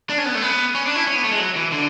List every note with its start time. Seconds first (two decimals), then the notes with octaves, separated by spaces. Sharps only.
0.09 D4
0.18 C#4
0.26 B3
0.35 A3
0.42 B3
0.75 C#4
0.86 D4
0.96 E4
1.07 C#4
1.16 B3
1.24 A3
1.32 G#3
1.39 F#3
1.56 E3
1.72 D3